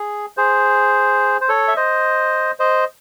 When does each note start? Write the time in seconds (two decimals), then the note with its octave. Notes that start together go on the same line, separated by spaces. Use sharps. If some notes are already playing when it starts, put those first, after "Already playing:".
Already playing: G#4
0.37 G#4 C5
1.41 C5
1.49 A4 C#5
1.68 E5
1.76 C5 D#5
2.59 C5 D#5